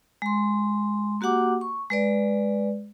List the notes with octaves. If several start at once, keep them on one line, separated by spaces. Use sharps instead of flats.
G#3 C6
A#3 F#4 G4 F#5 D6
C#6
G#3 B4 D5